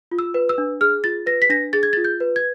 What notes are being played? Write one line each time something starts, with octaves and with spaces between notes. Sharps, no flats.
F4
E6
B4
E6
D4
G#4 F6
F4 A6
B4 A#6
B6
D4 A#6
G#4 A6
G#6
A6
F4
G6
B4
G#6